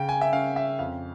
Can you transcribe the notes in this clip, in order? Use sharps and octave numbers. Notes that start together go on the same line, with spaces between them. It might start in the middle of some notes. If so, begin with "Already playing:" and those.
Already playing: C#3 G5
G#5
E5
C#4 F5
E5
F2 F5